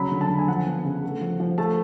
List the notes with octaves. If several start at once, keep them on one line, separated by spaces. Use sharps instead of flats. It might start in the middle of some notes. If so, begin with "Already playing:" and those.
Already playing: C#3 F#3 B5
D3
A5
D3
G#5
F3 F#5
B3
C#3
A3
F3
F3
A3 A5